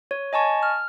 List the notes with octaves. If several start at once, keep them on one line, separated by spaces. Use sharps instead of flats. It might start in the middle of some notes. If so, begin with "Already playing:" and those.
C#5
D#5 G#5 A5 C#6
F6